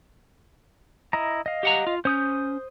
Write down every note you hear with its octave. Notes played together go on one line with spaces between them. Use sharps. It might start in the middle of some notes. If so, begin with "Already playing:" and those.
E4 D#5 A#5
D#5 F5
G4 F#5 A#5
F4
C#4 C5 D#6 G6